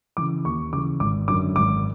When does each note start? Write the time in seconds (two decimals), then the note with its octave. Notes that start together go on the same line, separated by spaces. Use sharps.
0.17 C#3 E3 D6
0.45 D#2 C#6
0.73 C#3 D6
0.77 E3
1.00 G#1 D6
1.28 F#2 D3 D6
1.56 G#1 D6